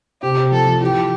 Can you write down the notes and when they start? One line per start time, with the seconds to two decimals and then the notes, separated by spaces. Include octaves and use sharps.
0.22 C3 G4
0.37 C3
0.52 F3 A4
0.67 F3
0.81 E3 G4
0.95 E3